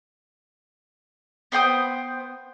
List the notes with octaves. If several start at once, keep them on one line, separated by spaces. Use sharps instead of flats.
B3 C5 G5 D#6